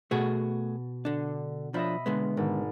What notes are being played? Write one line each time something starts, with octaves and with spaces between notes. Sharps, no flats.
B2 A3 F#4 G#4
D3 D4
F3 D4 D#5 E5 B5
D3 G#3 B3
G#1